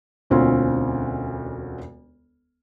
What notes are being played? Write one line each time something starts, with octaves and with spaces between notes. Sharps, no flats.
E1 D2 C4 C#4 F4